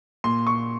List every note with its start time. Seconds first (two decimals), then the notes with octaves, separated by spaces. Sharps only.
0.24 A#2 C6
0.47 C#6